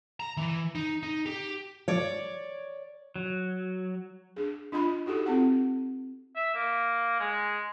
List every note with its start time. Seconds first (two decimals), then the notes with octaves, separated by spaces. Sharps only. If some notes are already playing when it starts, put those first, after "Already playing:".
0.20 A#5
0.37 E3
0.75 D#4
1.03 D#4
1.26 G4
1.88 C#5 D5
3.16 F#3
4.36 D4 G#4
4.72 D4 F4 D#5 B5
5.06 D#4 F#4 G4 A4
5.26 C4 F4 A4 F#5
6.36 E5
6.54 A#3
7.19 G#3